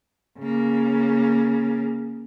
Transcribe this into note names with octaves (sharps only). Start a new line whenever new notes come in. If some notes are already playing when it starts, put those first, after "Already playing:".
C#3 A#3